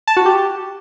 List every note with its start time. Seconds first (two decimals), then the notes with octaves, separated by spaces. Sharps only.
0.07 A5
0.17 F#4
0.26 G4